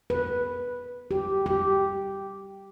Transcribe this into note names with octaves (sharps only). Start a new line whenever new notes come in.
B4
G4
G4